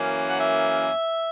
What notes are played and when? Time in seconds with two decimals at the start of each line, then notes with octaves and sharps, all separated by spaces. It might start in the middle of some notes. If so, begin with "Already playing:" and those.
Already playing: F#2 E3 A#3 C#4
0.29 F#5
0.39 E5